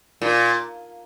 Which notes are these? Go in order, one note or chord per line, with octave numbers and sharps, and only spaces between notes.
A#2